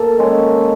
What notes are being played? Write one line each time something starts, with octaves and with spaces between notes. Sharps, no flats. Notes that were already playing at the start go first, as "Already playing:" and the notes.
Already playing: A#3 A4
D#3 G#3 C#4